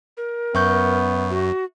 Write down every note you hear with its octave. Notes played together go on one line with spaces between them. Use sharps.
A#4
F#2 B3 E5 C#6 G6
F#4